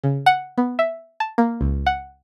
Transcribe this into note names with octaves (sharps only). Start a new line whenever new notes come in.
C#3
F#5
B3
E5
A5
A#3
C#2
F#5